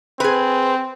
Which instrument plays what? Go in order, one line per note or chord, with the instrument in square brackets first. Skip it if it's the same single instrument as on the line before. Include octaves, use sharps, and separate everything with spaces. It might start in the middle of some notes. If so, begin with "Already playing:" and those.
[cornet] C4 [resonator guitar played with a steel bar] G#4 B4